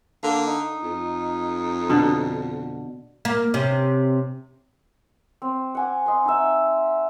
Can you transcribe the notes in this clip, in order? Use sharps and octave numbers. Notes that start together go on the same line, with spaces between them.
D3 A#3
D#4
F2
B2 D3
A#3
C3 C#4
C4
F#5 G#5 D6
D#5 C6
D#4 E5